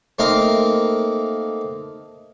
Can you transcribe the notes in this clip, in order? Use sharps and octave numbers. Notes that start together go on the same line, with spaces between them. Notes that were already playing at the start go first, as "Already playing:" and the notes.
A3 A#3 C4 D#4 A#4 F5